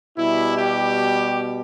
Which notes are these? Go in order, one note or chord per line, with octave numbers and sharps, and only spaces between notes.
B2 G3 E4
G4